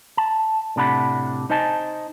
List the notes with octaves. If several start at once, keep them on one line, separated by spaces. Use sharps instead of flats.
A5
A2 C3 D4 F#5 B5
D#4 C5 D#5 G#5 A5